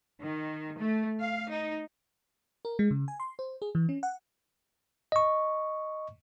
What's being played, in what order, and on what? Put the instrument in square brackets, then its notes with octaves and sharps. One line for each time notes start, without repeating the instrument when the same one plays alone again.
[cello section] D#3
A3
F5
D#4
[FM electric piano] A#4
G#3
C#3
G#5
C6
C5
G#4
E3
C#4
F#5
[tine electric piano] D#5 C#6